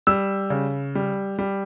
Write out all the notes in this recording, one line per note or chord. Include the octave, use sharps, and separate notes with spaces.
G3 E6
C#3
G3
G3